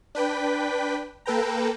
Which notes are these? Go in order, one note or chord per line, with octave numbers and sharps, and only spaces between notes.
D4 B4 G5 B6
A#3 A4 B4 G5 A#5